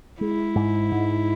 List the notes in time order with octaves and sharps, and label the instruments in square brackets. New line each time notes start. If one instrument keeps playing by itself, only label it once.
[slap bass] G#3 [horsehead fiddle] E4
[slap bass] G#2
G#2